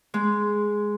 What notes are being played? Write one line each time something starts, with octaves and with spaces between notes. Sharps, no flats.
G#3